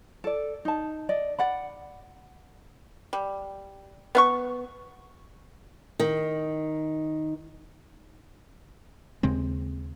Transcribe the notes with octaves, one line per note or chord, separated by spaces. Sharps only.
A4 D5
D#4 A5
D5 D#5
D5 F#5 B5
G3
B3 F5 C#6
D#3
D#2 C#3 G#3 C4